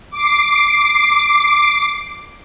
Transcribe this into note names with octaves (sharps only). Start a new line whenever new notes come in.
D6 C7